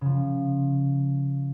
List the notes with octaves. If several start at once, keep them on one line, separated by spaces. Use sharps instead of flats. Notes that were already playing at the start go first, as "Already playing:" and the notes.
C#3 F3